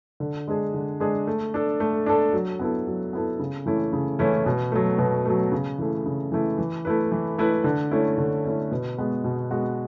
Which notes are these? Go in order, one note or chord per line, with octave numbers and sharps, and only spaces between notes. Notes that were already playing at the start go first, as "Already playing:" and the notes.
D3
G#3 D4 G#4
D3
G#3 D4 G#4
A3
D4 A4
A3
D4 A4
F#3
B3 E4 A4
F#3
B3 E4 A4
C#3
E3 A3 C#4 E4
C#3
E3 A3 C#4 E4
B2
F#3 A3
B2
F#3 A3
C#3
E3 A3 E4
C#3
E3 A3 E4
E3
A3 E4 B4
E3
A3 E4 B4
D3
A3 C#4 E4
D3
A3 C#4 E4
B2
G#3 B3 F#4
B2
G#3 B3 F#4